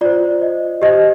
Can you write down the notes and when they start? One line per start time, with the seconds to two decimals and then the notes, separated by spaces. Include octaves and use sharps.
0.01 F4 C5 D5
0.41 D#5
0.82 G4 C5 D#5